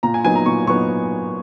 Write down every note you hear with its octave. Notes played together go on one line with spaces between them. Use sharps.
A#2 A#5
G#5
F#3 B3 D#4 G#5
A#5
A#2 C#6
F#3 B3 D#4 C#6